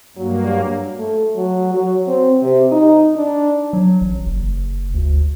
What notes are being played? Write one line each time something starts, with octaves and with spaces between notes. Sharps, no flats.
G2 F#3 A#3
A3
F#3
F#3
C4
C3
D#4
D4
F#3
A1
F#1
D2